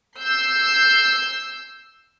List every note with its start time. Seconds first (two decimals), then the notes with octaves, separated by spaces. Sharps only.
0.20 E6 G6 C7